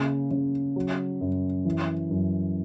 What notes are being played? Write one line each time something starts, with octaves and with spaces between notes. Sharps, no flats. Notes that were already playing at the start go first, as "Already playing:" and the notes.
Already playing: C#3 A#3 C#4
C#3
F#3
F#2
E3
F#2